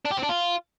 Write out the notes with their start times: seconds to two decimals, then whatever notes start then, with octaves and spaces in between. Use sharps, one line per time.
0.05 D4
0.11 G4
0.17 C4
0.23 D4
0.29 F4